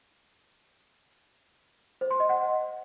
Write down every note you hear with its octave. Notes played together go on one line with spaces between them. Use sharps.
C5
C6
D#5
F#5